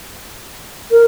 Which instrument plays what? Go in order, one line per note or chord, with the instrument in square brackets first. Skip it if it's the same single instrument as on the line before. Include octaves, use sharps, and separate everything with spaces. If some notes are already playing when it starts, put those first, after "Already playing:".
[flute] A#4